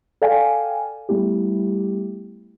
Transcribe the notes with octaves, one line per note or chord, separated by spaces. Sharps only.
A4 D5 F5 G5 G#5
G3 A3 B3 E4 G4